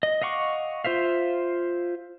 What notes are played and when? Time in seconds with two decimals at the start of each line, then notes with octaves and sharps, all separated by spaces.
0.03 D#5
0.22 D#5 F5 F#5 C#6 D6
0.84 F4 C5 E5 F5